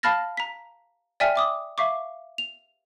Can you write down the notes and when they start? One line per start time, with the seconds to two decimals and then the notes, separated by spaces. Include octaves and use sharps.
0.03 F5 A5 B5 F6 A6 A#6
0.37 A#5 B6
1.20 D5 E5 G5 G#5 F6 B6
1.36 E5 D6 D#6
1.78 E5 F5 C#6 D6
2.38 F7